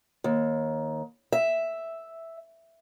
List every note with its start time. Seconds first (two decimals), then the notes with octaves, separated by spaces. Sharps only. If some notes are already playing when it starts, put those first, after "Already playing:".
0.24 D#2
1.32 E5